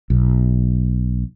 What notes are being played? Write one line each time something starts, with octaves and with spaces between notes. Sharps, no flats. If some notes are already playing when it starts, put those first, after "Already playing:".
B1